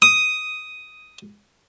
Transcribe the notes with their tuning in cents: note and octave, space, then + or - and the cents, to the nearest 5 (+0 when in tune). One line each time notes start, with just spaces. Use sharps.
D#6 +5